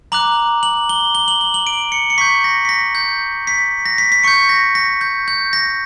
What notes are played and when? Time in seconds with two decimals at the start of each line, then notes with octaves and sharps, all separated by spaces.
0.12 A#5 D6 F#6 F#7
0.63 F#7
0.89 G7
1.15 G7
1.28 F#7
1.41 G7
1.54 F#7
1.67 D7
1.92 C#7
2.10 C#7
2.18 C#6 G6 B6
2.44 A#6
2.65 B6
2.69 A#6
2.95 G6
3.47 B6
3.86 A#6
3.98 B6
4.12 B6
4.23 C#6 G6 C#7
4.49 A#6
4.75 A#6
5.01 G6
5.28 G6
5.53 A#6